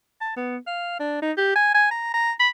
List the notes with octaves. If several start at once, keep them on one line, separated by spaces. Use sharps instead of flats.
A5
B3
F5
D4
D#4
G4
G#5
G#5
A#5
A#5
B5